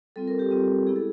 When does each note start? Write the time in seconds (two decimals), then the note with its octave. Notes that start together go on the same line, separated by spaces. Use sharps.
0.16 G3 C4 F4 A4
0.28 A#4
0.39 G4
0.51 G3 C4 F4
0.87 G#3 B3 E4 G#4
0.96 A4